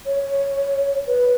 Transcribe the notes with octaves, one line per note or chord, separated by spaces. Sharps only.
C#5
B4